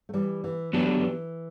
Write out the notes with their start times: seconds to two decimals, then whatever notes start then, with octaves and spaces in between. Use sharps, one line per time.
0.09 A3
0.13 E3 G3
0.44 E3
0.73 E3 F#3 B3 D4 G4
0.87 D3
1.00 E3